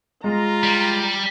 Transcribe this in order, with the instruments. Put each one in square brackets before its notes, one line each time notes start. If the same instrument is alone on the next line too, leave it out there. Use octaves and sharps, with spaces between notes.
[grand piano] G#3 [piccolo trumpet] F4 [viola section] A#5
[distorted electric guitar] G3